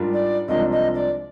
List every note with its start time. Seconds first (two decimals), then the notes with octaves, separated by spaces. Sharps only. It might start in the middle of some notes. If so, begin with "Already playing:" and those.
Already playing: G#2 G3 D4 F4 A#4
0.14 D5
0.48 C2 C3 F3 G#3 D4 D#5
0.72 D#5
0.95 D5